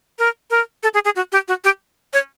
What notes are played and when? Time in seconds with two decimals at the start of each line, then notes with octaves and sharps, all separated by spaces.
0.19 A#4
0.50 A#4
0.83 A4
0.94 G#4
1.05 G#4
1.16 F#4
1.32 G4
1.48 F#4
1.64 G4
2.13 C#5